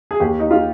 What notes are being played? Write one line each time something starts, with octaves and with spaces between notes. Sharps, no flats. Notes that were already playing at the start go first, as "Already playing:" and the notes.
G#4
D#2 G4
D#4
F4